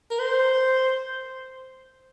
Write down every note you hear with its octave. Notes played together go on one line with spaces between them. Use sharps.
A#4
C5